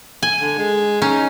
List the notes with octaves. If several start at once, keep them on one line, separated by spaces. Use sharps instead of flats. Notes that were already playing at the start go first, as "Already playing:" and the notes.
G#5
D3
G#3
C#4 D#4